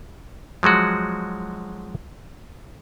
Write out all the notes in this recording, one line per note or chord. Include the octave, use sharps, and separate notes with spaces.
F3 F#3 G#3 F#4